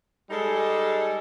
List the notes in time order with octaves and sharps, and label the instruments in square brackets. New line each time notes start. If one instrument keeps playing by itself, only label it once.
[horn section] G3 G#3 D#4 G#4 A4